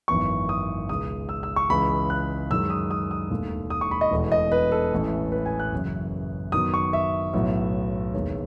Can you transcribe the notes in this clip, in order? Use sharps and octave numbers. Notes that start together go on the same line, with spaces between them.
G#1 F#2 E3 B3 C#6
D#6
C#2 B2 G#3 D#6
E6
E6
C#6
C#2 C#3 E3 G#3 B5
F#6
F#2 D#3 G#3 E6
D#6
D#6
D#6
E1 D#2 D#3 A3
D#6
C#6
B5
D#5
E1 E2 B2 A3
D#5
B4
A4
A1 A2 E3
B4
G#5
F#6
F#1 F#2 C#3 E3
F#2 D#3 F#3 B3 D#6
C#6
E5
B1 A2 F#3 B3
E1 D#2 D#3 G#3 B3 C#5